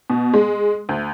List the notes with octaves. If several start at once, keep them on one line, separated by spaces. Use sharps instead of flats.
B2
G#3
D2